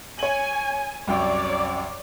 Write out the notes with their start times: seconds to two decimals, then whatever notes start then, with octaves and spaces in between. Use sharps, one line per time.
0.19 C#5 G#5 F#7
1.07 C2 F#2 C#5 D5 G5